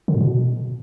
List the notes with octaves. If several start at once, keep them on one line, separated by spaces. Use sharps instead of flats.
D3
A2
B2